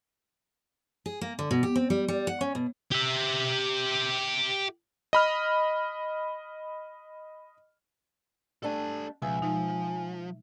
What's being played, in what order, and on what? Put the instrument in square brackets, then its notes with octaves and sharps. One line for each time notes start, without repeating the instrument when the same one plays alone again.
[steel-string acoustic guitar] G#4
A#3
D3
B2
G4
C4
G3
G3
F#5
C#4
B2
[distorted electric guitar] G4 E5
[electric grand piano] D#5 B5 F6
[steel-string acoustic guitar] G3 A3 D4 [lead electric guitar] A4 G#5
[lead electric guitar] C#2 [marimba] B2 F3 [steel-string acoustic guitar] E5 [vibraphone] G#5
[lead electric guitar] F3 [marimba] G#3 D#4